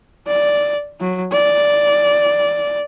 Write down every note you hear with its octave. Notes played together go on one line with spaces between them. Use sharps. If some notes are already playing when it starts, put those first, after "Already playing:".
D5
F#3
D5